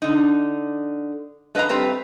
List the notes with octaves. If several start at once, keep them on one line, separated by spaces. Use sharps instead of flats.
D3 D#4
A3 B4 D#5 F5 A#5
G2 A3 C4 G4 B4 A#5